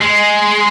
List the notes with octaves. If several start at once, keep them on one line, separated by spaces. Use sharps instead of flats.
G#3